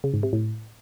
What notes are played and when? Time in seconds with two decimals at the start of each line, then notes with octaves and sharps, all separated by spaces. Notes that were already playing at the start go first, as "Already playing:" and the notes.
0.04 C#3
0.14 G#2
0.23 C3
0.33 A2